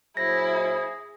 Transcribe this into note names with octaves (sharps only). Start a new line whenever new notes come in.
A#2 F#3 E4 G#4 C5 A#6